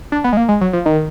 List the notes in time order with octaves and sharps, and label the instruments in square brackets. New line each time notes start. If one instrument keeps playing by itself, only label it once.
[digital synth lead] D4
B3
G#3
A#3
G#3
F#3
F3
D#3